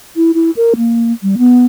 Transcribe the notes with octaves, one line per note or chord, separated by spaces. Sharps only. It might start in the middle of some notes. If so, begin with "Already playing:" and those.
E4
E4
A#4
A#3
G3
B3